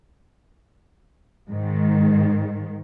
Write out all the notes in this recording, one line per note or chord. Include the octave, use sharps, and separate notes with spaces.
G#2 D#3